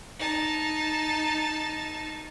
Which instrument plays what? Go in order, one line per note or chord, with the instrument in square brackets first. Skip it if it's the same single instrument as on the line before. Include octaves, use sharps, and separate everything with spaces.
[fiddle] D#4 A5